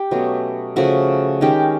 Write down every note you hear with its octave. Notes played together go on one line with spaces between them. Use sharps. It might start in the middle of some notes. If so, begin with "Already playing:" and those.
Already playing: G4
B2 F#3 A3 C#4
C#3 F3 A3 F#4
D#3 G#3 C#4 G4